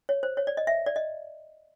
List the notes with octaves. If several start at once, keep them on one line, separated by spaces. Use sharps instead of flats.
C#5
C5
C#5
D5
D#5
E5
D5
D#5